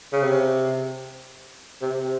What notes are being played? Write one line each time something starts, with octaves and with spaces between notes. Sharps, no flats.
C#3
C3
C3
C3